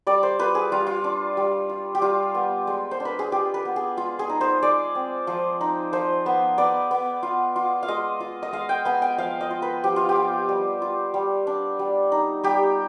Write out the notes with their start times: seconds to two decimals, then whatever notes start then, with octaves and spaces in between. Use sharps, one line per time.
0.07 G3 D5
0.23 C5
0.39 F4 B4
0.55 G#4
0.72 G3 F4
0.87 F4
1.04 D4
1.37 G3
1.69 F4
1.95 G4
2.02 G3 F4
2.35 B3
2.67 G#3
2.91 C5
3.00 D4
3.05 B4
3.19 G#4
3.32 F4 G4
3.54 B4
3.65 B3
3.76 G#4
3.97 G#3 F4
4.19 G#4
4.29 D#4
4.41 C5
4.62 G#3 D5
4.95 C4
5.27 F3
5.61 D#4
5.93 F3 C5
6.26 B3
6.58 B3 D5
6.91 B3
7.23 F4
7.56 F4
7.83 F5
7.88 G#3 D#5
8.20 F4
8.43 D#5
8.53 G#3 F5
8.69 G5
8.85 B3 G#5
9.02 G5
9.18 F3 F5
9.41 D#5
9.51 F4
9.62 B4
9.84 F3 G4
9.96 F4
10.09 G4
10.16 B3
10.49 G3
10.82 F4
11.14 G3
11.47 D4
11.79 G3
12.12 D#4
12.44 G3 G4